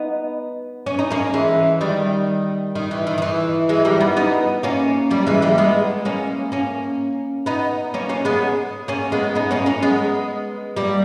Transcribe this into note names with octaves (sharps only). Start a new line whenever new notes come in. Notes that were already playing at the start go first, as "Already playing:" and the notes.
Already playing: B3 D#4
C#4
D#4
A#3 C#4
E3 G#3
D#3 G3
D#3
E3
D#3
D#3
E3
E3 G#3
G3 A#3
B3 D#4
B3 D#4
A#3 C#4
G3 A#3
E3 G#3
G3 A#3
G#3 B3
A#3 C#4
A#3 C#4
B3 D#4
A#3 C#4
A#3 C#4
G#3 B3
A#3 C#4
G#3 B3
B3 D#4
A#3 C#4
A#3 C#4
G#3 B3
G3 A#3